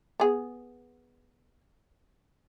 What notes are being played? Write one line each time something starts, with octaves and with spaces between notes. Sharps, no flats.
B3 G#4